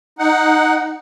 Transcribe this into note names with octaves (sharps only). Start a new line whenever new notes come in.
D#4 F#5